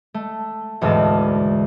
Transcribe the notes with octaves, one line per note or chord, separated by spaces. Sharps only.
A3
E1 D2 G#2 E3 A5